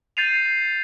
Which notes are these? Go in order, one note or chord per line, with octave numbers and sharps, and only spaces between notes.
G6 A6 C7 D#7 F7